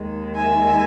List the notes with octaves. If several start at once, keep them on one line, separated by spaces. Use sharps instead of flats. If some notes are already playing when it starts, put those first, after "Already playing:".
Already playing: D#2 D#3 G#3
E5 G#5